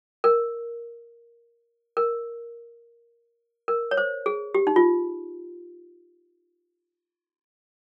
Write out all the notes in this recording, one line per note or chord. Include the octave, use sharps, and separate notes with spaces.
A#4
A#4
A#4
C#5
C5
G#4
G4
D#4
F4